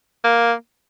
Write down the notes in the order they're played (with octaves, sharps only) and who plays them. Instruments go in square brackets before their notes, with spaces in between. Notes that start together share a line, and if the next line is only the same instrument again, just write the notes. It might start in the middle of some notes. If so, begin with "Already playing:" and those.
[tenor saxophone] A#3